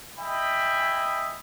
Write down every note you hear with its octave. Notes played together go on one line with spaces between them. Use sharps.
D#5 E5 G5 G#5 B5